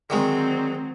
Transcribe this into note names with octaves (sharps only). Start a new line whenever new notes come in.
D3 D#3 F#3 G#3 C4